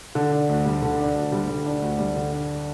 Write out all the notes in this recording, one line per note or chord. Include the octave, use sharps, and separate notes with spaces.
D3
D4
D2
G3
D3
D4
D2
G3
D3
D4
D2
G3
D3
D4